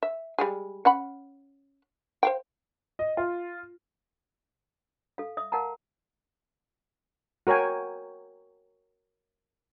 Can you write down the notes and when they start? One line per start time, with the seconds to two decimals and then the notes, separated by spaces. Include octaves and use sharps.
0.03 E5
0.39 G3 G#3 G#4
0.85 C#4 F#5 B5
2.23 C5 F5 G5
2.99 D#5
3.17 F4
5.18 A4 F5
5.37 E5 D#6
5.52 A#4 F5 F#5 A5 A#5
7.47 F#4 A#4 C#5 G5 G#5